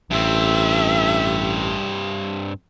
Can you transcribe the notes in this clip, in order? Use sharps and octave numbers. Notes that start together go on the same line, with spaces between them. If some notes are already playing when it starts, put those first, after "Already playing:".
A1 G2 C4 E5